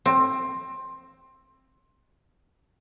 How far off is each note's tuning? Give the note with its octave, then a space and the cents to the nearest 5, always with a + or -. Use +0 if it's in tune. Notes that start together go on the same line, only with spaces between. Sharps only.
C4 +15